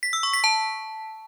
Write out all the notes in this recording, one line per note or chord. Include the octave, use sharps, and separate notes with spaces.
B6
E6
C#6
B6
A5